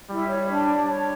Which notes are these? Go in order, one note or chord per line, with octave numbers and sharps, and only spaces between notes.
G3 E4
C#5
D4
C#5
C#5